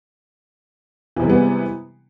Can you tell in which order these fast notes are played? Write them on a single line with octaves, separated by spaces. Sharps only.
E3 C3 G3 G#3 B3